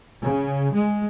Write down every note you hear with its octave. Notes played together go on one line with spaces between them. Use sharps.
C#3
G#3